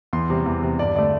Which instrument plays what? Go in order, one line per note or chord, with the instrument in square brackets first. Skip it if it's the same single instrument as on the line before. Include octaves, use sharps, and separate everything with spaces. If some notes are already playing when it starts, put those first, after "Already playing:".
[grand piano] E2 C6
C3 G3
E2
C3 G3
G2 D5
D3 A3 D5